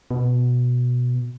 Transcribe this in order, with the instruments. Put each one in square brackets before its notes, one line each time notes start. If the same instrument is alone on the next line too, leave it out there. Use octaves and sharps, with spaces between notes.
[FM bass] B2